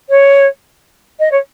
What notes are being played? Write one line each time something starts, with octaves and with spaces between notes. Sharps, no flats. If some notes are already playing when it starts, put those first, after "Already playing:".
C#5
D#5
C#5